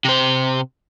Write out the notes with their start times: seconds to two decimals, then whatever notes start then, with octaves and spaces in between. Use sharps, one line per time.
0.05 C3 C5